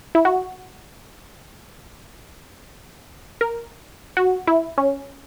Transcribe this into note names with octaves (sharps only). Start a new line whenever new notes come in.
E4
F#4
A#4
F#4
E4
C#4